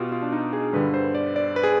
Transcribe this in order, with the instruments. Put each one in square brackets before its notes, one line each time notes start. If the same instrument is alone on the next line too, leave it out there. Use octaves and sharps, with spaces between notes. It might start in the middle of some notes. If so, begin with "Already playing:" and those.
Already playing: [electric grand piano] B2 F4 G4
F4
D4
D#4
G#4
G2 D3 G3 B4
C5
D5
D5
B4
G#4